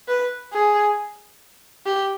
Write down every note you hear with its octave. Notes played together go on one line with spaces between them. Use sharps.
B4
G#4
G4